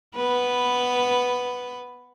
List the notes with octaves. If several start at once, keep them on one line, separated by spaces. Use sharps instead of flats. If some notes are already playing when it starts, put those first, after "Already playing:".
B3 B4